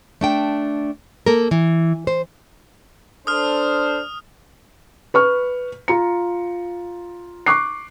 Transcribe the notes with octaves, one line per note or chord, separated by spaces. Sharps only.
A3 D4 G5
A#3 A4 A#4
E3
C5
D4 A4 C5 D#6 F6
B4 C#6 F6
F4 A#5 C#7
C#6 D6 F#6 C7